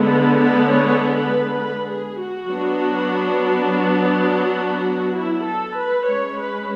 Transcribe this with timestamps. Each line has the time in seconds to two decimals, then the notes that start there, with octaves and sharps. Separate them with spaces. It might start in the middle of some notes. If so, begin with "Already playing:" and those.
Already playing: D3 G#3 B3
0.10 B4
0.40 B4
0.69 C#5
1.15 B4
1.59 B4
1.88 G#4
2.19 F#4
2.49 F#3 B3 D4
4.29 F#4
5.18 E4
5.47 A4
5.78 B4
6.07 G#3 C#4 C#5
6.38 B4